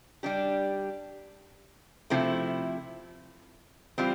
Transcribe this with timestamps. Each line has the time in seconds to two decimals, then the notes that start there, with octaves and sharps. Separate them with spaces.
0.23 G3 D4 G4
2.10 C3 F3 A3 C4 E4
3.98 E3 G3 C4 F4